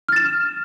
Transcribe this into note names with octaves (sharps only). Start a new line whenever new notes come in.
F6 A6 E7